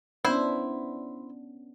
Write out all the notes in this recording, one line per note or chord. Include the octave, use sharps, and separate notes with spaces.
B3 C#4 D4 E4 C5